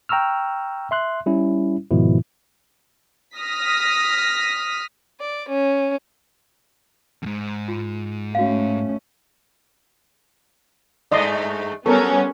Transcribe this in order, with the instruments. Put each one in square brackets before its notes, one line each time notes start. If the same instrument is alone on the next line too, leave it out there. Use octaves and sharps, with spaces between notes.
[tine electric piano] G5 A#5 C#6 E6 F6
E5 C6 F#6
G3 C#4 E4
G#2 B2 D#3 F3 E4
[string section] D#6 F6 A#6 B6
[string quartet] D5
C#4
[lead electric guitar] F2 G#2
[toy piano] F4
[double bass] A3 C#4 [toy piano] F#4 F5
[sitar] G2 G#3 A3 [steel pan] D5 D#5 C6
[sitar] F#3 [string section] G3 B3 C#4 [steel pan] A4 A#4